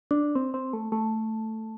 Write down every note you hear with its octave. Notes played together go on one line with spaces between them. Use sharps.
D4
C4
C4
A3
A3